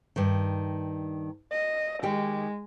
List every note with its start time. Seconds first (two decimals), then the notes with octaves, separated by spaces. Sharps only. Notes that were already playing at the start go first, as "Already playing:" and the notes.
0.16 G2 D#3
1.52 D#5
2.03 D#3 G#3 G4